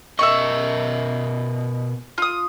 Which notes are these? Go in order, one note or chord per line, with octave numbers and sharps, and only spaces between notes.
B2 A#4 D#5 E5 C#6
F4 D#6